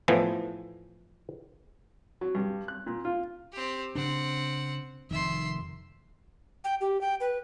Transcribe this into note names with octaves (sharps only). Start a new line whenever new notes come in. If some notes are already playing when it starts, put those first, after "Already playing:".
A2 E3 F3 B3
F#3
G2
F#6
A#2
F4
C4 G4
C#3 C4 D4 F#5
F1 D#3 E5 C6
G5
G4
G5
B4